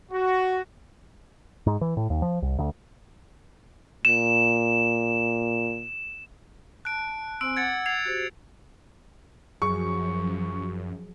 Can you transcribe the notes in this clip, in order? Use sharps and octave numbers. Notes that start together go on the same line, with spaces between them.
F#4
G#2
E3
A2
D#2
F3
C2
D2
A#2 E7
A5 F#6 D7
C4 C5 G#5 E6 D7
F#5 D6 G#6 A6 C#7
G#6 C7 F7
F#4 G4 C5
F#2 F3 F#3 G#4 C#6